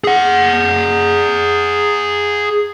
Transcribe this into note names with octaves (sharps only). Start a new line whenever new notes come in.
G#4 F#5